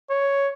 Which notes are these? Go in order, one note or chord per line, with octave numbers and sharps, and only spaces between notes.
C#5